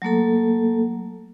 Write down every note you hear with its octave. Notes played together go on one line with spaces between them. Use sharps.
F#3 A3 A#3 A4